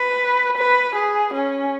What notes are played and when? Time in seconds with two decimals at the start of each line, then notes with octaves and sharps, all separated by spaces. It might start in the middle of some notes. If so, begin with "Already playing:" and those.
Already playing: B4
0.57 B4
0.95 G#4
1.34 C#4